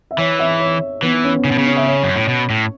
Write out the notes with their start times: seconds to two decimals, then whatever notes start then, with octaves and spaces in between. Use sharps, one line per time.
0.11 E5
0.18 E3 C#5
0.39 E5
0.60 C#5
1.02 E3 B3
1.13 B3
1.24 C#4
1.34 B3
1.44 C#3 C#4
1.51 B2
1.55 C#3 B3
1.66 C#4
1.76 E5
1.86 C#5
2.03 F#2
2.16 A2
2.28 B2
2.50 A2